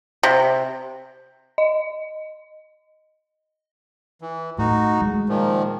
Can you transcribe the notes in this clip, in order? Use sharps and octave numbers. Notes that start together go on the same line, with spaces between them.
C3
D#5
E3
A2 D#4 F#4
G#3
A#2 D#3 F3